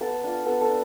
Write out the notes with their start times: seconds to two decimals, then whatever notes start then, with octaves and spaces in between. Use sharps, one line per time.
0.01 B3 A4 A5
0.24 D4 F4
0.46 B3 A4 A5
0.61 A4 A5
0.69 D4